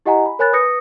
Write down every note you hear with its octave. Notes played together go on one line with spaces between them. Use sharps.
E4 G4 D#5 F#5 G#5 A#5
B5
A#4 C#5 G#5 B5 F#6 A6
B4 D#6 G6 A#6 C#7